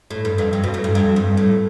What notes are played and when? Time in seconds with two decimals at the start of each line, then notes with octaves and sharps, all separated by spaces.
0.11 A2
0.25 G2
0.38 F2
0.53 G2
0.64 B2
0.74 A2
0.84 G2
0.95 F2
1.16 G2
1.37 A2